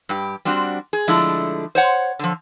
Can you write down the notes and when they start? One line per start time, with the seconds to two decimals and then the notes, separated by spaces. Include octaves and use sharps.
0.09 G2 G4
0.45 G3 C4 D4 F#4
0.93 G#4
1.07 D3 F3 G#3 A3 D4 E4
1.75 C5 C#5 F#5
2.19 D3 F3